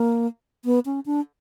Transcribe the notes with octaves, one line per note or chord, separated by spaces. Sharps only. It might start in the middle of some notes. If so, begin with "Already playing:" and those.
Already playing: A#3
B3
C#4
D4